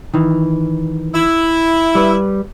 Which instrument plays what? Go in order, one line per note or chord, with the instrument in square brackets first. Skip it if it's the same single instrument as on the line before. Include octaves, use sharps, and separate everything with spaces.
[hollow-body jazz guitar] D#3 E3
[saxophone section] E4
[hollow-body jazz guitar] G3 B4